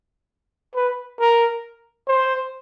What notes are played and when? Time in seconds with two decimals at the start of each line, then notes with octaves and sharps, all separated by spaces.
0.76 B4
1.20 A#4
2.08 C5